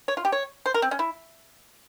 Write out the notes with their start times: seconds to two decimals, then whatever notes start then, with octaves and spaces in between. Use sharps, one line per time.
0.08 C#5
0.17 F4
0.25 G4
0.32 C#5
0.66 C5
0.74 A#4
0.82 C4
0.91 C#4
0.99 E4